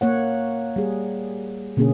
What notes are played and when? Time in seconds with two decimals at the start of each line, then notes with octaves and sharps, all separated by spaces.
0.01 A#3 C#5 F#5
0.76 G3 G#4
1.77 B2 D3 A#3 C#4 G#4